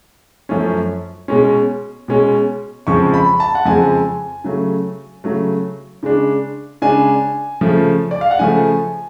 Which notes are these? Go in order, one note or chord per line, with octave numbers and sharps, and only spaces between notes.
F#2 F3 A3 C#4
B2 G#3 C#4
B2 G#3 C#4
F2 C#3 F3 G#3 C#6
B5
A5
F#5
F2 C#3 F3 G#3 G#5
C#3 F#3 A3
C#3 F#3 A3
C#3 G#3 D4
C#3 G#3 D4 G#5
C#3 F3 A3
D5
F5
F#5
C#3 F3 A3 G#5